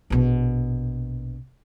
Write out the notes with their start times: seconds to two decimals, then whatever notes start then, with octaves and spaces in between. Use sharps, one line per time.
0.10 A#1 B2